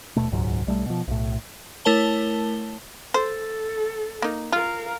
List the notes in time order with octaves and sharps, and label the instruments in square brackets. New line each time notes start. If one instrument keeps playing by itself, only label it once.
[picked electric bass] D#1 B2 A3
D#1 C#2 G#2 F#3
B1 G3 A3
B2 F3
B1 A2
[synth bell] A3 E4 A#4 C#5 A5 G7
[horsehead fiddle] A4 [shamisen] C5
[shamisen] A#3 D#4
[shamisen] F4 [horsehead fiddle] A#4 F5